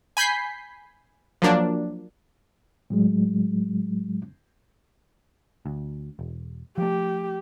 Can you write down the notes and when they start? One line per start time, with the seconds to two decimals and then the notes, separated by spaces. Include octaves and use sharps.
0.17 G#5 B5 G6 B6 C7
1.42 F3 F#3 A#3 D4
2.90 A2 F#3 G#3
5.66 D2
6.19 E1
6.78 F3 A3 G4